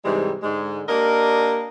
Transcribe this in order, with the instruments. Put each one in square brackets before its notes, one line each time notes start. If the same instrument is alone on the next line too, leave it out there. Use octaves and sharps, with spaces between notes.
[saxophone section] G#2 C3 E3 G3 G#3
G#2 D3 G#3
A#3 D4 G4 A#4 D#5